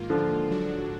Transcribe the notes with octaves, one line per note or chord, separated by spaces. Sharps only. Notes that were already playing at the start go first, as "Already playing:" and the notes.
Already playing: G#2 D#3 A#3 F4
D3 F3
G#2 F#3 D4 F#4